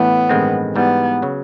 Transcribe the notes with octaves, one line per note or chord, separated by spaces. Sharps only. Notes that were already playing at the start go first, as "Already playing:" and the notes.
Already playing: A2 E3 A3 B3 C#4
A1 G2 D#3 G#3 C4
G#2 E3 G3 B3
C#3 F#3